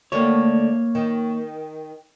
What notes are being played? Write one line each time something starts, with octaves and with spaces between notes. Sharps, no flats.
D3 A3 A#3 F#4 C#5
D#3